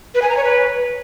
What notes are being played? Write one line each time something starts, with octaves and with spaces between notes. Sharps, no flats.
B4
G#5
A#5
C#5
B4